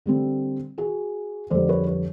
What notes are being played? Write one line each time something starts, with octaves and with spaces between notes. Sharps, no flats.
D3 G3 C4
F#4 G#4
F2 D3 G3 C5 D5
B4 C#5
B4 C#5